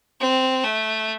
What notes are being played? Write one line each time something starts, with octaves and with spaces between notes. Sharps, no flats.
C4
A3